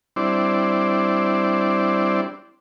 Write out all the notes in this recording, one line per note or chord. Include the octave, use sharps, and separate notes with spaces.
G3 C4 D4 E4 C5 D5